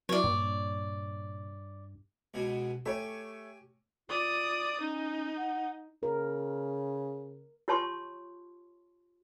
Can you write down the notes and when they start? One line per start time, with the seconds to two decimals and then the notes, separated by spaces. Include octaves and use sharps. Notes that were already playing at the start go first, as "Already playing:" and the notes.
0.09 F#3 E4 C#5 D5
0.24 G2 A#2
2.34 C#2 B2 G#5
2.86 A3 G4 C#5 G#5
4.09 F4 D5 D#6
4.80 C#4 D#4
5.37 F#5
6.03 C#3 A#4
7.68 F4 G4 C#5 A5 C6 C#6